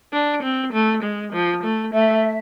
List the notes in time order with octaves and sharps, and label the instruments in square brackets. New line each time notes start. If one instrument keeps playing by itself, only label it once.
[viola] D4
C4
A3
G#3
F3
A3
[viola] A3 [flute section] E5